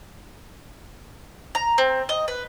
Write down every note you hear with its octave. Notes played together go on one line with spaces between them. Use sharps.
A#5
C4
D#5
B4